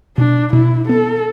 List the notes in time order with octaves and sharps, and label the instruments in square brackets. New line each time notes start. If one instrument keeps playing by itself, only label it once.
[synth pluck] B2 [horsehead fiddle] D4
[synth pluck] B2 [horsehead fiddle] E4
[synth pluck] B3 [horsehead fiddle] A4